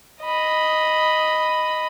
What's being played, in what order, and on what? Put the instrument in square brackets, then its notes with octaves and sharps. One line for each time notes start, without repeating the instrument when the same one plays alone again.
[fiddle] D#5 B5